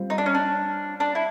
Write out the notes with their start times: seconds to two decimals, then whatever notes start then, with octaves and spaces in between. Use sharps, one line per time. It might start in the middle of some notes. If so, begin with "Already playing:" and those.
Already playing: G3 C4 F4
0.10 D#4
0.18 D4
0.26 C#4
0.35 D4
1.00 D4
1.15 E4